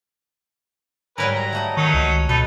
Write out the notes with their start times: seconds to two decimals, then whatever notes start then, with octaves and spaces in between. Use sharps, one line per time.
1.18 G#2 F#3 G3 A#4 B4 G#5
1.35 A#5
1.53 A3 F#4 D#5
1.77 D#3 F#3 C#4 D#4
1.94 C#2
2.29 B2 D#4 A4 B4